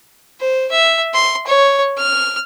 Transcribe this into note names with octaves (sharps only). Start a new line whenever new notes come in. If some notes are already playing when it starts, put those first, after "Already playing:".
C5
E5
C6
C#5
F6